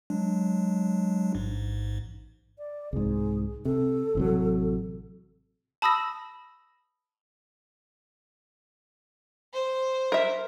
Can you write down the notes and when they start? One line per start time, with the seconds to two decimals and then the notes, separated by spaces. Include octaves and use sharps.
0.10 F#3 G#3 D4
1.34 A1 G#2
2.58 D5
2.93 C2 G#2 G#4
3.65 C3 A4
4.15 A1 C3 F#3
5.82 A5 B5 D#6 E6 A#6
9.53 C5
10.12 A#4 E5